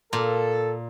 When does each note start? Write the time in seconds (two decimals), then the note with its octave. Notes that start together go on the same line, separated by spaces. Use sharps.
0.13 A#2 A4